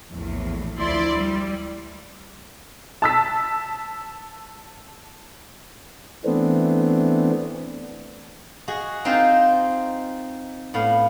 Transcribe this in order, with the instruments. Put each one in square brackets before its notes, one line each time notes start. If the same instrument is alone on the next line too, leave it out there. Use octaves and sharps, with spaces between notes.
[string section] A#1 E2 A2
D2 F3 E4 D5 C6
G3
[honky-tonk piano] A5 E6 B6
[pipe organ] E3 A3 B3 C4 D4
[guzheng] F#4 G#4 D#5
C4 D#4 F4 A#4 C5
A2 B3 F5